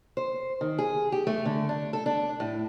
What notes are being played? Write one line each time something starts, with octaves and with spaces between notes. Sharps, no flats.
C5
D#3
G#4
G4
A3
D3
D4
A4
D4
A2